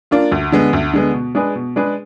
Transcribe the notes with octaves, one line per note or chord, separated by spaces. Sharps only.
A#3 D4 F4
D2
D3 G#3 B3
D2
D3 G#3 B3
B2
G#3 D4 G#4 B4
B2
G#3 D4 G#4 B4